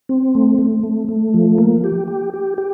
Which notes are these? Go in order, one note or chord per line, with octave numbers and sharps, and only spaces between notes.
C4
A3
A3
A3
A3
F3
A#3
G4
G4
G4
G4